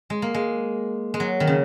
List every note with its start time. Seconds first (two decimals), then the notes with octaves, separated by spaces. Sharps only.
0.10 G#3
0.22 A#3
0.34 G#3
1.14 G#3
1.20 F#3
1.40 D#3
1.47 C#3